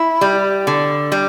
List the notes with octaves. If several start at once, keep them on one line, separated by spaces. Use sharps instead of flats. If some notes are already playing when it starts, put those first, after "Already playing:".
Already playing: E4
G3
D3
G3